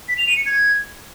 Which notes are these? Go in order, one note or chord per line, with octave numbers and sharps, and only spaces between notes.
B6
F7
D#7
C#7
G#6